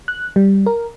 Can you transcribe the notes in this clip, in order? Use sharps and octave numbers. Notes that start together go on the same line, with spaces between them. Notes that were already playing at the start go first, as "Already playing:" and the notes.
F#6
G3
A#4